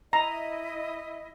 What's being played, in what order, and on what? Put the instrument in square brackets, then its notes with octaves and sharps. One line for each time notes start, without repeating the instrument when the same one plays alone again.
[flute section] E4 D#5 [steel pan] A#5